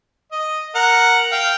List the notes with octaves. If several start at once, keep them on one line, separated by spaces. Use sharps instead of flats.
D#5
A#4 F#5
F5 G5